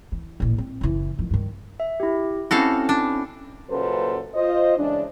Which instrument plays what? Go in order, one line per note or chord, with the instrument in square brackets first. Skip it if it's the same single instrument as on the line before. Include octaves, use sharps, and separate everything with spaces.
[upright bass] E3
A1 A#2
C4
F#1 E3
D#3 F3
G2 D#3
[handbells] E5
E4 G4
[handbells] C4 C#4 E4 [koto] F#4 A4 F5
[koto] D4
[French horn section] F#2 A#2 C#3 A4 B4 C5
F4 C5 D#5
C#3 E3 G#3 D4